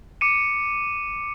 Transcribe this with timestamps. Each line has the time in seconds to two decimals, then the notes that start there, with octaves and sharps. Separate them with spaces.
0.21 D6 C#7 D#7